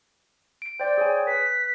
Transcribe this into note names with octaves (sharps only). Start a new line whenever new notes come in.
D7
C5 D5 G5
G#4 C#5 G#5
B4 B6